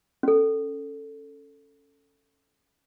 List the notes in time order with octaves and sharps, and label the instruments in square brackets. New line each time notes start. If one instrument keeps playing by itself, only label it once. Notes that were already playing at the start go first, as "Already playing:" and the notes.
[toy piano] C#4 A4